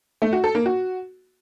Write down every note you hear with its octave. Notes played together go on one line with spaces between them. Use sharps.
A3
F#4
A4
A#3
F#4